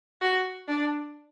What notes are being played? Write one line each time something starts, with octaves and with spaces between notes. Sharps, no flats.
F#4
D4